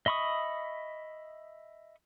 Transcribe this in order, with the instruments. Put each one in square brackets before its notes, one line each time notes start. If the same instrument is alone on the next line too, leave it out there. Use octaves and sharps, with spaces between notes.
[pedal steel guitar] D#5 E5 B5 C#6 D#6